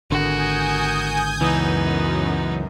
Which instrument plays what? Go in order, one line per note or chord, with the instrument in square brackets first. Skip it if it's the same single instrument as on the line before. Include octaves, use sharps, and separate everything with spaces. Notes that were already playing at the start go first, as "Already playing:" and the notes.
[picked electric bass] G#1 D3 [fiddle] F#4 A#4 [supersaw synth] G#5 D#6 G6
[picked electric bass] C#2 [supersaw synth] F#2 [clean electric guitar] E3 [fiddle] B3 D#4